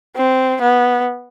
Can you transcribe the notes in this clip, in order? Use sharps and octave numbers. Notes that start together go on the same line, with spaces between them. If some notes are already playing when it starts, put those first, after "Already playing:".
C4
B3